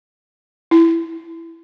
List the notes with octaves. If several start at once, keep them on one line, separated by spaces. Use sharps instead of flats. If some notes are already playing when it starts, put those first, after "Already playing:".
E4